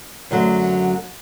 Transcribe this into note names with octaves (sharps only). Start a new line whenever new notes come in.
F#2 D3 F#3 A3